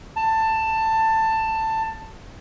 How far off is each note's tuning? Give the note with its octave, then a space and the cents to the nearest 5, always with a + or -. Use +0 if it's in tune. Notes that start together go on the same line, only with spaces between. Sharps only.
A5 +15